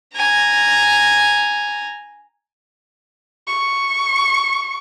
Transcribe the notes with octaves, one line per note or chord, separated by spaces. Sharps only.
G#5 A#5
C#6